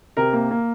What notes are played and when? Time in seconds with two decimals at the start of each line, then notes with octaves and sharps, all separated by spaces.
0.17 C3 A#4
0.33 A#3
0.51 A#3